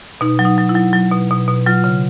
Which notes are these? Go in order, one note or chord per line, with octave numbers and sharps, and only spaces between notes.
B2 D#4
F#3
D#4
F#3
E4
F#3
F#3
B2
B2
B2
F#3 F4
C#3